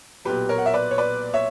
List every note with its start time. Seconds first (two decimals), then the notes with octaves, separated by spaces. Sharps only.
0.25 B1 A#2 F#3 G4 B4
0.49 A#4 C#5
0.58 F#5
0.66 E5
0.74 B4 D5
0.91 C#5
0.98 B4 D5
1.34 C#5 E5